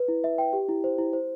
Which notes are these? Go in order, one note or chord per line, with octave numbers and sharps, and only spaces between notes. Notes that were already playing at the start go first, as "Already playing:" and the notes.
Already playing: B4
E4
E5
G5
G4
E4
C5
E4
C5